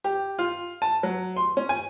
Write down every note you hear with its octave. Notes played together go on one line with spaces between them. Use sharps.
G4
F4
A5
F#3
C6
C#4
G#5